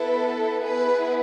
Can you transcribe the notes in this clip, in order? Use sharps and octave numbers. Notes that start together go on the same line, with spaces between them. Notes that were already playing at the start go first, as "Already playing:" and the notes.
Already playing: B3 E4 A4 B4
B3 E4 G#4 B4